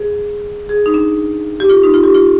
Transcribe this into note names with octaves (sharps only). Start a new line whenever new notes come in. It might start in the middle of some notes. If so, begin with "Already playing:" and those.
Already playing: G#4
G#4
D#4
D4
G4
F4
D#4
F4
G4
F4